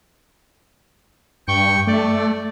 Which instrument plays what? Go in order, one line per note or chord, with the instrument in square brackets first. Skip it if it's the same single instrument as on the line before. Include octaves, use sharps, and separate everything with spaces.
[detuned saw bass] G2 [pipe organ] G5 C#6
[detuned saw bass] A3 [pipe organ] D5